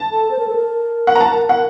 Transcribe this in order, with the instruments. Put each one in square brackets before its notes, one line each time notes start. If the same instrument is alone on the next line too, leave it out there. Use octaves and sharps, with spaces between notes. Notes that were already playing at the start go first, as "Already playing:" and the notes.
Already playing: [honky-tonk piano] A5
[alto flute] A4
C5
A#4
A4
A#4
[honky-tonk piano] F#5
A#5
A5
F#5